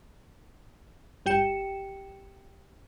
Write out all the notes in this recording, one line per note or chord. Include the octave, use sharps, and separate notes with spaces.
G1 G4 G5 C#7 E7